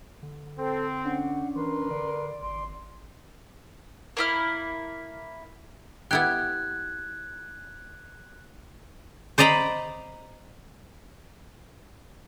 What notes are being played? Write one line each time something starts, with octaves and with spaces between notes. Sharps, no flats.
D3
C4 A4
C#4 D4 F#5
E3 A#4 B4 C6
D3 D5
G#1 C6
A#3 E4 F6
B3 E4 G4 F#6 G#6
C5 D5 D#5 A#5 B5